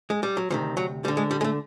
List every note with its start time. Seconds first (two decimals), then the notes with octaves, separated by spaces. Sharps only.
0.10 G#3
0.23 G3
0.37 F#3
0.50 D2 C3 D#3 F3
0.77 F#3
1.04 D2 G3
1.08 D3
1.17 G#3
1.31 G3
1.41 G#3
1.44 A3